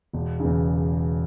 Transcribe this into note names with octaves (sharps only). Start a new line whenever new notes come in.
E1
E2 C#3